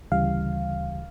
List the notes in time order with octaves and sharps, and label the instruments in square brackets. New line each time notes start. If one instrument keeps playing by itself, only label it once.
[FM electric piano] D2 C#3 E3 G3 F5